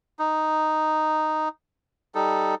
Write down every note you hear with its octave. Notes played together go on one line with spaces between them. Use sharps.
D#4
G3 D#4 A4